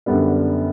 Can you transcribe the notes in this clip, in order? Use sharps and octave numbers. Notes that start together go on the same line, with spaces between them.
F#2 D3 G3 B3 D4